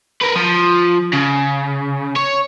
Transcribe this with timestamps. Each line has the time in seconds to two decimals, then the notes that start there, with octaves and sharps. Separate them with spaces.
0.21 A#4 B4
0.35 F3
1.13 C#3
2.16 C#5